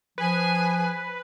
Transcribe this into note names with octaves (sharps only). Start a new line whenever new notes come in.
F3 G#4 B4 G#5